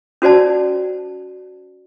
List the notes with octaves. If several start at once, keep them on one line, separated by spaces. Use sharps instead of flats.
C#4 F#4 C5 D5 A5